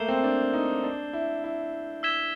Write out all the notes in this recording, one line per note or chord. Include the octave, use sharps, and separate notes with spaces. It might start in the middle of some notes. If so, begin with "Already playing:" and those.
Already playing: A3 A#3 G6 C7 E7 G7
C4
D4
D#4
D4
E4
E4
E6 G#6 B6 E7 G7